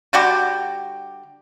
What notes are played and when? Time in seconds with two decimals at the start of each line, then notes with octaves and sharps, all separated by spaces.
0.13 D3 G3 F#4 G4